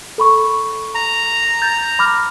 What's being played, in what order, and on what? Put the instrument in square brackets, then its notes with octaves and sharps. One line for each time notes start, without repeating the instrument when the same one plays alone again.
[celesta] A4 B5 C#6
[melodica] A#5
[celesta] G6 A6
B5 D6 F6